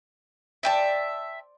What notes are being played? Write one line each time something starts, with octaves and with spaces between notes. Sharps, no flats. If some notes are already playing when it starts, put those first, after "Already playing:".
C5 D5 E5 G5 A5